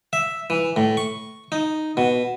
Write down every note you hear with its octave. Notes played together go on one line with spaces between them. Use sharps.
E5
E3
A2
C#6
D#4
B2